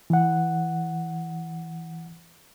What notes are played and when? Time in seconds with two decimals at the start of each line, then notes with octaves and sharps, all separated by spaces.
0.10 E3 F#5